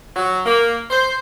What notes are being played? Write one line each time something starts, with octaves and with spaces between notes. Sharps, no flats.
F#3
A#3
C5